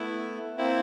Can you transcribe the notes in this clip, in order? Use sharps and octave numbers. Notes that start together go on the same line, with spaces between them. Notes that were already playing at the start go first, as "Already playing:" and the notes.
Already playing: A3 B3 E4
A#3 C4 E4